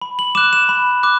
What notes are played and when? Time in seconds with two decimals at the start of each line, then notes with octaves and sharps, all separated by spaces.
0.02 B5
0.19 F#7
0.35 D6 F#6 E7
0.53 E7
0.69 B5
1.03 D6 F#6